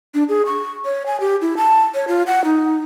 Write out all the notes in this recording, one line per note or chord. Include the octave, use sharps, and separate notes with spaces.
D4
G#4
C#6
C#5
G#5
G4
E4
A5
C#5
F4
F#5
D#4